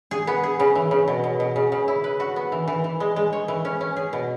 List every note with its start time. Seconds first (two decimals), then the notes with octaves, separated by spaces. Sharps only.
0.11 G#4
0.27 B3
0.44 G#4
0.60 C#3
0.75 E3
0.91 C#3
1.08 B2
1.24 B2
1.40 B2
1.56 C#3
1.72 C#3
1.88 E4
2.04 B4
2.20 F#4
2.36 B3
2.52 E3
2.68 E3
2.84 E3
3.00 G#3
3.16 G#3
3.33 C#5
3.48 E3
3.65 C#4
3.81 C#4
3.96 G#4
4.13 B2